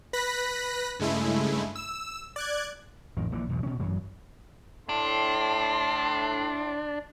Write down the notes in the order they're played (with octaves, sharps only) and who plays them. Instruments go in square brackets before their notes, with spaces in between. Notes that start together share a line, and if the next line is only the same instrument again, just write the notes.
[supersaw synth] B4 B5 F#6 A#6 B6
G2 C#3 G#3 A3 E4
E6
D5 F#6 G#6
[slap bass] A1 F2 D#3
A#1 A#2 D3 E3
B1 E2 G2 B2
B2 C#4
A1 F#2 E3 F#3
[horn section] A2 C6 [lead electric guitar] D4